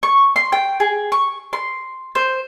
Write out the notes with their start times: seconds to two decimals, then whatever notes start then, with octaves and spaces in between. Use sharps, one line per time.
0.03 C#6
0.36 C6
0.52 G5
0.80 G#4
1.12 C#6
1.53 C6
2.15 C5